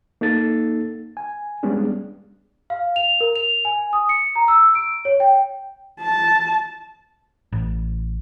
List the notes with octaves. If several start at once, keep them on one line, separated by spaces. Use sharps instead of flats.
A#3 D#4 A4 A6
G#5
G3 G#3 B3 C#4 D4 G#4
F5
F7
A#4
F7
G#5
D#6
C#7
A#5
E6
D7
C#5
G5
A5
A1